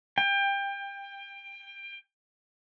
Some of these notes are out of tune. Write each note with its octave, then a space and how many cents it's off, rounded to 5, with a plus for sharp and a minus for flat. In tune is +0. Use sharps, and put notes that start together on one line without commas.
G5 +25